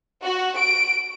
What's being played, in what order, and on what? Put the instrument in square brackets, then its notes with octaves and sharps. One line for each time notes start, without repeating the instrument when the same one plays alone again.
[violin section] F#4
D7